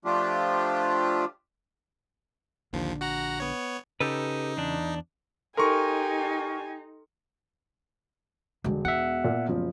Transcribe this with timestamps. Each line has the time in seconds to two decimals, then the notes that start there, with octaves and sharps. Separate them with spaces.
0.05 F3 A3 D4 F4 G4
2.73 A#1 D#2 D3 F3
3.01 F#4 F#5 A#5
3.40 B3 C#5
4.00 C#3 D#4 G4 A4 B4
4.57 E2 D4
5.57 D#4 G4 A4 A#4 G#5 C6 C#6
8.64 E1 D3 G#3
8.85 B3 E5 F#5
9.24 A#2
9.48 F#1 F3